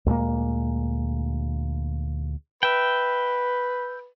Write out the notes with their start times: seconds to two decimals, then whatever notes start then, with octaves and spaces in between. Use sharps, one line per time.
0.06 D2 A#2 G#3 A#3
2.63 B4 E5 G5